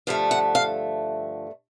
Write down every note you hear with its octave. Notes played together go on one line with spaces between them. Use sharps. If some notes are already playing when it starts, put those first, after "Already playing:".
G2 D3 F3 A3 F5
F#5
F5